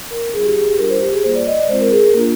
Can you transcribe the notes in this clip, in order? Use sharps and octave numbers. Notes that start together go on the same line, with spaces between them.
A#4
G3 D4 F4 G#4
G4
G#4
G4
G3 D4 F4 A#4
C5
G4
G#4
G3 A#3 F4 C5
D5
D#5
D5
G#3 C4 F4 C5
A#4
G#4
A#4
A#3 D4 F4